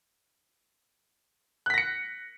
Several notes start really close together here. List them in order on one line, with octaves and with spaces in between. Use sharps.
F#6 B6 A#6 C#7